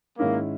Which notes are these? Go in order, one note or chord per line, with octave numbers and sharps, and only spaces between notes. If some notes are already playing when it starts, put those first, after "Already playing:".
G#2 D#3 G#3 A#3 C#4 E4